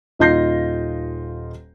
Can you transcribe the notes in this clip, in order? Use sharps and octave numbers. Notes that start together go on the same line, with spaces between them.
D#1 D#4 F4 G6 A#6 C7